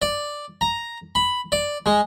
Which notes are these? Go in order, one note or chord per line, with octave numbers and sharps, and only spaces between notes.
D5
A#5
B5
D5
G#3